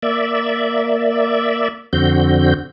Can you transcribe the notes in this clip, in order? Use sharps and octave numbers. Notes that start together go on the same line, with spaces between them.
A#3 D5 E5
F2 D3 C4 F#4 G6